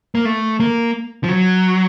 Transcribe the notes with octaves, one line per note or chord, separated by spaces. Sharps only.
A#3
A3
A#3
F3
F#3